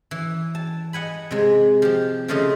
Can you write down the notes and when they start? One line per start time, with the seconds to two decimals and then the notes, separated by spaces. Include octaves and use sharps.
0.11 E3
0.55 A5
0.93 D#5 F#5 G#5 B5
1.31 C3 G#3
1.82 F3 G4
2.28 C#3 F3 A3 F4 D#5